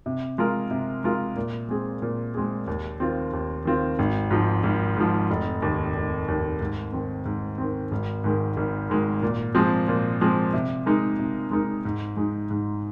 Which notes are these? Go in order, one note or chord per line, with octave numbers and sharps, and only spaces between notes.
C3
G#3 F4 A#4
C3
G#3 F4 A#4
A#2
G#3 C4 G#4
A#2
G#3 C4 G#4
D#2
D#3 C4 F4
D#2
D#3 C4 F4
G#1
G#2 F3
G#1
G#2 F3
F1
D#2 D#3
F1
D#2 D#3
G#2
D#3 C4
G#2
D#3 C4
G#1
G#2 D#3 G#3
G#1
G#2 D#3 G#3
A#2
F3 G#3 C4
A#2
F3 G#3 C4
C3
G#3 D#4 A#4
C3
G#3 D#4 A#4
G#2
G#3 D#4
G#2